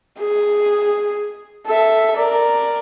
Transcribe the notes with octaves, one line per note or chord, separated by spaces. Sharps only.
G#4
A4 E5
A#4 D5